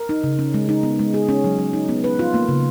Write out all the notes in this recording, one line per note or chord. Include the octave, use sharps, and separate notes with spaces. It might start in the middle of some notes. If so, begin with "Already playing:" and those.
Already playing: A#4
D#4
C#3
C#4
G#3
D#4
B3
G#3
G#4
C#4
F#3
F#3
D#4
B3
B4
F4
A#3
C#3